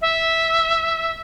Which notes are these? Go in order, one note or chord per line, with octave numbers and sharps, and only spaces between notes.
E5